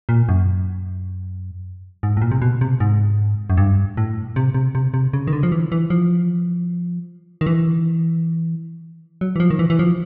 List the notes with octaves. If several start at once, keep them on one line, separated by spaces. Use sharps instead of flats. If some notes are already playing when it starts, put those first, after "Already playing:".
A#2
F#2
G#2
A2
A#2
C3
B2
C3
G#2
F#2
G2
A2
C3
C3
C3
C3
C#3
D#3
D3
F3
E3
E3
F3
D#3
E3
F#3
E3
F3
D#3
E3
E3
F3